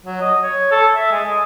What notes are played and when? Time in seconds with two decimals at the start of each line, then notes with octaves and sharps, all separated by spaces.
0.06 F#3
0.21 D#5
0.43 C#5
0.71 A4
0.95 E5
1.11 G#3
1.26 D#5